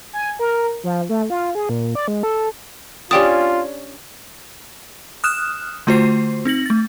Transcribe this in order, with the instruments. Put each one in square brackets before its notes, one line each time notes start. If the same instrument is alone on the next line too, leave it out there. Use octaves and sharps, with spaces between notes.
[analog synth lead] G#5
A#4
F3
A3
F4
G#4
A#2
D5
G#3
A4
[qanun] C#4 D4 A5 [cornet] F4 [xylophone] G4 G5 D#6
[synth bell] D#6 F6 F#6 E7
D3 A3 F4 F#4 C5 C7
C4 D#4 A#6 F#7
A3 A6